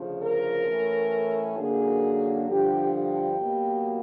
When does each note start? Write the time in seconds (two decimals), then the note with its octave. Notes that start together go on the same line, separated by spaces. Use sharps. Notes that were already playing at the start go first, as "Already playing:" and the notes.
Already playing: D2 C#3 F3
0.22 A#4
0.67 A2 E3 A3 C#4
1.57 F#2 D3 F#3 A#3 G#4
2.48 G2 D3 F3 G4
2.93 G4
3.38 B2 F#3 A#3